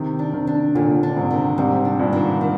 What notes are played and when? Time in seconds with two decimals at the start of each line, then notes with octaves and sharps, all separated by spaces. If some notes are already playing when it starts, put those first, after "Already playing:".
Already playing: C3 D#3
0.19 D4
0.34 C3 D#3
0.47 D4
0.75 D#2 A#2 D3
1.03 D4
1.16 G#2 C3
1.30 D#3
1.58 G#2 C3 G3
1.85 D4
1.99 G2 A#2
2.13 D#3
2.41 D#3